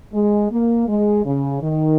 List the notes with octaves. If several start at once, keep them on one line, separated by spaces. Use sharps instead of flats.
G#3
A#3
G#3
C#3
D#3